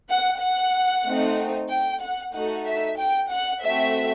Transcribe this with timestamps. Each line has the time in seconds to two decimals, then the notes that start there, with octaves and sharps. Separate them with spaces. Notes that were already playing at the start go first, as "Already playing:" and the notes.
0.09 F#5
0.41 F#5
1.06 A3 C4 D#4
1.71 G5
2.02 F#5
2.34 A3 D#4 F#4 A4 F#5
2.68 E5
2.99 G5
3.31 F#5
3.64 A3 C4 F#4 E5